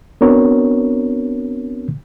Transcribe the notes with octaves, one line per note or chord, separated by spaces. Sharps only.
B3 C4 D4 F#4 A#4 C#5